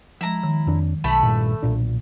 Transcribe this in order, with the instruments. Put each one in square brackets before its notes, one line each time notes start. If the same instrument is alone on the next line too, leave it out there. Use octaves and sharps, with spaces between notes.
[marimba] F3 G#3 [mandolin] E4 A#5
[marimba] D#3
[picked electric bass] F2 D4 [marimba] D#3
[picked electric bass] B1 [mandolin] A3 E5 B5
[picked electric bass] A#1 G2 A#2 [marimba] A5
[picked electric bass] B1 A#2 D4